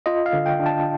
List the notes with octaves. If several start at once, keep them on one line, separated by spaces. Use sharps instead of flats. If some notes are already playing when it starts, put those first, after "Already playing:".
F4 D#5
F5
D3
G5
D4
A5